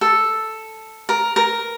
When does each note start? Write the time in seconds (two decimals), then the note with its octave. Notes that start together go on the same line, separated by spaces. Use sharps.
0.01 A4
1.09 A#4
1.36 A#4